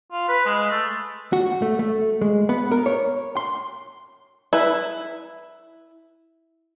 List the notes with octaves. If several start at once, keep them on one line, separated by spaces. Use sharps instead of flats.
F4
B4
G#3
A3
F#4
A3
A3
G#3
B3
A#4
C#5
C6
E4 B4